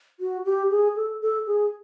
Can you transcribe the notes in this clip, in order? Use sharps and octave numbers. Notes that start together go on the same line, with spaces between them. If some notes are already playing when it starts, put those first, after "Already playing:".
F#4
G4
G#4
A4
A4
G#4